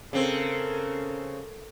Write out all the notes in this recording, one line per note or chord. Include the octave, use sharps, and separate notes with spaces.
C#3 C4 A4 A#4